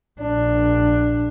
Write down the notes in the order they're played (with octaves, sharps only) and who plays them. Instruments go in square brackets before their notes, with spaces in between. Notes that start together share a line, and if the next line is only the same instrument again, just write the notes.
[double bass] A#1 D4